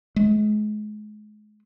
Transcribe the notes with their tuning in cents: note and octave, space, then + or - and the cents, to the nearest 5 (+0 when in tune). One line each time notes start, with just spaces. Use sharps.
G#3 +35